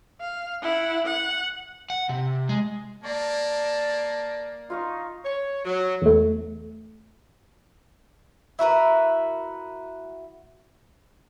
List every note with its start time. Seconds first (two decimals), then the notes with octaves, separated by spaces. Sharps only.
0.21 F5
0.62 E4 F#5
1.05 F#5
1.90 F#5
2.09 C3
2.49 G#3
3.04 A#3 D5 A5
4.70 D#4 F4 F5 C#6
5.24 C#5
5.65 F#3
6.02 E2 A3
8.59 E4 F#4 A#4 B4